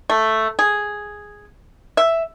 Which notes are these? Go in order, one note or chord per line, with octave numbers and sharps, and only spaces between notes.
A3
G#4
E5